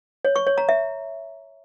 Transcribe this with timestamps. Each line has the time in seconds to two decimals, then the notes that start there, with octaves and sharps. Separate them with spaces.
0.25 C#5
0.36 C#6
0.47 C#5
0.58 A#5
0.69 E5